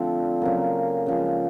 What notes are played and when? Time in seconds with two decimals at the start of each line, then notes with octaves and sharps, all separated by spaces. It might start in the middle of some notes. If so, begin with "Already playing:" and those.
Already playing: D3 F3 A3 C4
0.42 C#3 F#3 A#3
1.06 C#3 F3 G#3